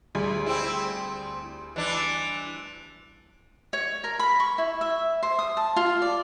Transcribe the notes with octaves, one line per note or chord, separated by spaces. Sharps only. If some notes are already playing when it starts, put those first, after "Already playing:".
D2 G3 G#4
C4 E4
E3 D4
C#5
A#4
B5
C#6
E4
E5
C5
D#6
A5
F4
D5